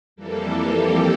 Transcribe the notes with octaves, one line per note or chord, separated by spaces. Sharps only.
F2 E3 G3 A#3 A4
G4